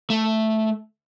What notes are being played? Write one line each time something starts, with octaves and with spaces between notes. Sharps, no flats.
A3